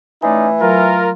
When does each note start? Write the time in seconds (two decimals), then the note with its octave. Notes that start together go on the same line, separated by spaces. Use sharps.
0.22 E3 A3 C#4 D#4 D5 G#5
0.61 F#3 F4 A#4